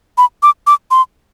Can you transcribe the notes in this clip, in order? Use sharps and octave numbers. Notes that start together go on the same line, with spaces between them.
B5
D6
D6
C6